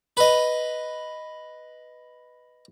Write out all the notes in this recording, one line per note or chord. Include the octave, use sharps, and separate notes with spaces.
B4 D#5